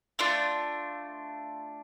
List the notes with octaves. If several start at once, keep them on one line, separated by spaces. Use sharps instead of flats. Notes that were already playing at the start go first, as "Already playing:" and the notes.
A3 D4 F4